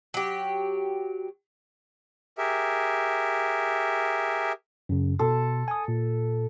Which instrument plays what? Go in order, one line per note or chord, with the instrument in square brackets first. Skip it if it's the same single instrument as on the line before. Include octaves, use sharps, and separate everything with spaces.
[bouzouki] F#3 G4
[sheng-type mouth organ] G4 G#4 A#4 E5
[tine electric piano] F#2 C#3
[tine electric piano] B2 C6 [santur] A4
[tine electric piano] G#5 D#6
A#2